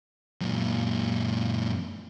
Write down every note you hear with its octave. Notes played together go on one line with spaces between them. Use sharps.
F#2 A#2